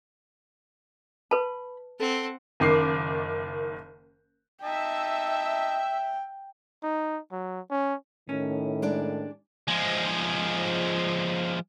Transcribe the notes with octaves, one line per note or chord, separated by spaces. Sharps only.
B4 A5 B5
C4 A4 F#5
F#1 D#3 D6 C7
D#4 D#5 E5 G5 A5
D#4
F#3
C#4
A2 D#3 C#4
G#3 D4 D5
F3 G#3